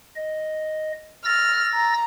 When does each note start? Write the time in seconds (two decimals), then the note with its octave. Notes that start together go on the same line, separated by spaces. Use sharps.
0.16 D#5
1.25 E6 F6 A6 A#6
1.74 A#5